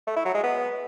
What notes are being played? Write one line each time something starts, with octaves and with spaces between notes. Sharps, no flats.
A3
E4
F#3
G#3
B3